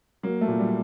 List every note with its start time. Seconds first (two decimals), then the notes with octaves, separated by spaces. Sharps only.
0.23 F#3 A#3
0.41 A3
0.47 A#2
0.59 G3